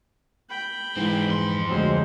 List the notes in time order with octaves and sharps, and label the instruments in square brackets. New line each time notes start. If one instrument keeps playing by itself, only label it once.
[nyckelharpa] G5 B5
[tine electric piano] G#2 E3 [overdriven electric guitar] G#3 C4
[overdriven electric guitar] F2 C6
[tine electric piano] D2 F#3 C4 [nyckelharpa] G#3 C5